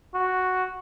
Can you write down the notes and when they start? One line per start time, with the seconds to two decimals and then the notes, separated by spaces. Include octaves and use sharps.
0.14 F#4